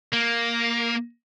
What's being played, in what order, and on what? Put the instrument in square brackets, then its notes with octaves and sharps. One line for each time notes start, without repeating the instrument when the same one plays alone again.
[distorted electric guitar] A#3